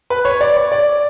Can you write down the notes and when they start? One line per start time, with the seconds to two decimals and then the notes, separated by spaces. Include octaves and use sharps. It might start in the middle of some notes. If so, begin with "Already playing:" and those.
0.10 B4
0.25 C#5
0.41 D5
0.56 C#5
0.72 D5